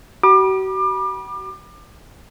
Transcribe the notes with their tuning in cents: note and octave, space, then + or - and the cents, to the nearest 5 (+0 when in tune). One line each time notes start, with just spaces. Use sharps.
F#4 +45 B5 -30 D6 +30